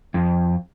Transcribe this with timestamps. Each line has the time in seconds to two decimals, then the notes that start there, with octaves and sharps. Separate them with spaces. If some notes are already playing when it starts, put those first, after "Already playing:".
0.14 F2